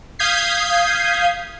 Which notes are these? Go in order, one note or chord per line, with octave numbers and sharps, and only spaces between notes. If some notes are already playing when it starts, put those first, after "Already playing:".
F5 D#6 G6 G#6 B6 C7